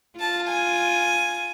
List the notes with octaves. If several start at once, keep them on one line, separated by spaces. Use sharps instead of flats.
F4 A5
G#5